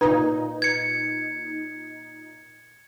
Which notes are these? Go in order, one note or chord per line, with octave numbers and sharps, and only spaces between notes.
A#2 D#4 B4
G#6 C#7